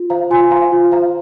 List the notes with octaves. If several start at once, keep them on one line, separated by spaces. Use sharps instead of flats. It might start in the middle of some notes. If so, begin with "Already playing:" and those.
Already playing: F4
C5 F5 A#5
F4 G#5 C6
C5 F5 A#5
F4
C5 F5 A#5